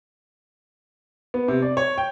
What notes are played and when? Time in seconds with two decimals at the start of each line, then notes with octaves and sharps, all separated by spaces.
1.34 B3
1.48 C3
1.62 D5
1.77 C#5
1.98 G5